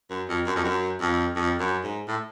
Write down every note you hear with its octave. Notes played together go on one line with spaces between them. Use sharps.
F#2
F2
F#2
F2
F#2
F2
F2
F#2
G#2
A2